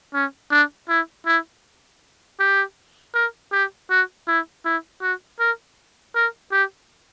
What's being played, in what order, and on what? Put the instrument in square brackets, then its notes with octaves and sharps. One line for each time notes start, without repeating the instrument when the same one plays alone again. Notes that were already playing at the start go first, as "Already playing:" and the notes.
[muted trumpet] C#4
D4
E4
E4
G4
A#4
G4
F#4
E4
E4
F#4
A#4
A#4
G4